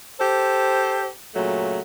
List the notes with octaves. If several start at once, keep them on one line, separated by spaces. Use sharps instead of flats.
G4 A4 C5
A#2 C#3 F#3 A3